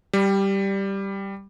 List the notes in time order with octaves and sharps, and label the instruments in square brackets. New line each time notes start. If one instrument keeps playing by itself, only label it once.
[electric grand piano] G3